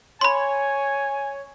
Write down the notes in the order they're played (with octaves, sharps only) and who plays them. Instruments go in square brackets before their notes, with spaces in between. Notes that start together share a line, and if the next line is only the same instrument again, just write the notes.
[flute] C#5 [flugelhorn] G#5 [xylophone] B5 C6